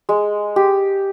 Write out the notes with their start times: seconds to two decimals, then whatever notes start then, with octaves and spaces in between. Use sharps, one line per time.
0.09 G#3
0.56 G4